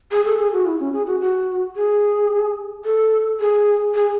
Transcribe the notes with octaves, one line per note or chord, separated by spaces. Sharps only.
G#4
A4
G#4
F#4
E4
C#4
G#4
F#4
F#4
G#4
A4
G#4
G#4